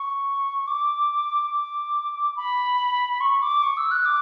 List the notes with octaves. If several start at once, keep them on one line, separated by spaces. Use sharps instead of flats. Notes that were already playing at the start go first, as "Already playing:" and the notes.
Already playing: C#6
D6
D6
B5
C#6
D6
C#6
E6
F#6
D6